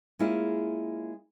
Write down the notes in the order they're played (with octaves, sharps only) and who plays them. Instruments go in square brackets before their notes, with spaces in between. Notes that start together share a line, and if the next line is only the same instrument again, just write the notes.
[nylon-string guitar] G#3 A#3 C#4 E4 F4 G#4